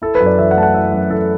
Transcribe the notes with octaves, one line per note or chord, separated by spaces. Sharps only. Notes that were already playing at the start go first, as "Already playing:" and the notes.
E4 A4
B4
F#2
D5
E3 E5
F#5
A3 A5
F#5
E4 E5
F#2
E3 A4